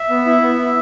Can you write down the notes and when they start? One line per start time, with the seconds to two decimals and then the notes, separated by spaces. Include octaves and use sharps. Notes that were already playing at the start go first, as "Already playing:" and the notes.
Already playing: E5
0.10 B3
0.26 E4
0.42 B3
0.59 E4